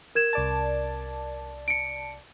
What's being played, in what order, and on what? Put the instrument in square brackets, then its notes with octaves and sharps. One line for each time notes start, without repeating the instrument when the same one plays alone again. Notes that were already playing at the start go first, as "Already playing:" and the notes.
[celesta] A#4 G#6 E7
[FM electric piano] C2 D5 A5
[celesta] C#7 D7